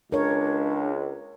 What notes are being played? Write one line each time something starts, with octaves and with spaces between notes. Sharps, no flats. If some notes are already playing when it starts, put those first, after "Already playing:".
C#2 D4 A#4 C#5